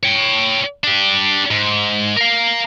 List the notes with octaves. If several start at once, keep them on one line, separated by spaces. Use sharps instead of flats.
C#5 G5
D4 G4
G#2
A#4 F5